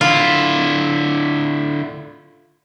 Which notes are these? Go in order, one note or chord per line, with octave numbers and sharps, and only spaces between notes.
D3 E4 F4